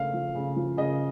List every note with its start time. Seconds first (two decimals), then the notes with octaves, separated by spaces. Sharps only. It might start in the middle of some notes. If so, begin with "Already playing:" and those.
Already playing: C#3 A3 D4 F5
0.14 F3
0.35 C#3
0.56 F3
0.77 C#3 D#5